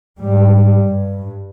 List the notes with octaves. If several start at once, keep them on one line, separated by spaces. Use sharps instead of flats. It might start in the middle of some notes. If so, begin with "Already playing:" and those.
G#2 G3
G2